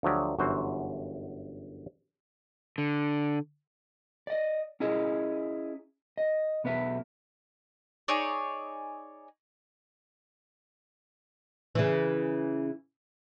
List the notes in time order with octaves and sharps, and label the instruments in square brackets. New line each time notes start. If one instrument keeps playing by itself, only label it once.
[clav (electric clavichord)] D2 F3 F#3 G4
G1 F#2 E3 F#4 C5
[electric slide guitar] D3
[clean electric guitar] D5 D#5
C#4 E4 G#4 D#5
D#5
B1 B3 B4 E5
[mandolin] D#4 G#4 C#5 D5
[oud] C#3 E3